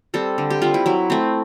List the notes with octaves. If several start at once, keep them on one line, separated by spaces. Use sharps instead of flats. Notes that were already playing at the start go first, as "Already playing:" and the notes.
G3 C4 A4
D3
G4
G3 C4 F4
E4
F#3 E4
A3 C4